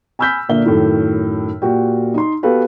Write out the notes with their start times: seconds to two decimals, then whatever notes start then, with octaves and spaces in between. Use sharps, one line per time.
0.19 G#5 B5 E6 F6 G6 B6
0.49 A#2 D3 A#3 E5 G7
0.66 F#2 A2 D#3
1.62 A#2 F#4 G4 G5
2.14 D#4 C6
2.43 B3 F#4 G4 A4 B4 F5